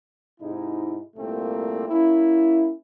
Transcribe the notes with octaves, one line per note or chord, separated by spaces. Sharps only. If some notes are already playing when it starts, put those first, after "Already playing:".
G#2 C3 D#4 E4
C2 A#2 A3 A#3 C4
A#3 C#4 E4